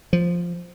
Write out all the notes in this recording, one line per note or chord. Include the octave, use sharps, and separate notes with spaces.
F3